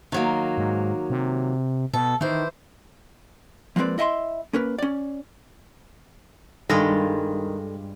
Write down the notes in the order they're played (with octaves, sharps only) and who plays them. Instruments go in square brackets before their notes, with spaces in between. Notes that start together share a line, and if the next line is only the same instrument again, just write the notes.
[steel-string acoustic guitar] D#3 F#3 A#3
[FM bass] G#2
C3
[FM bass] B2 [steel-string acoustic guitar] A4
[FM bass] D#3 [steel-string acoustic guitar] E3 C5
[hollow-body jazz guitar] F3 G#3 A#3 C4 B4 D5
E4 D#5 E5 G5 C6
A#3 C#4 A#4 B4
C#4 D5
[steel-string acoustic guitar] G2 [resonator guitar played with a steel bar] D#3 [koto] G3 G#3 F4 [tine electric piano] A4 A#6